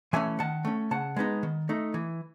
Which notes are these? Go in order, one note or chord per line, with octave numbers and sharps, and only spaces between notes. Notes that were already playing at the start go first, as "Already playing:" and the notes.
E3 A3 C#4 E5 G#5
D#3 F#5 A5
A3 C#4
C#3 F#5 A5
G#3 B3 D#4
D#3
A3 D#4
E3